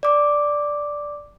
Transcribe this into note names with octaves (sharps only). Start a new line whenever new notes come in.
D5 D6